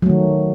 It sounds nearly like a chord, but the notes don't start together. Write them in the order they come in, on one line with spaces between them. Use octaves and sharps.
F#3 A3 D#3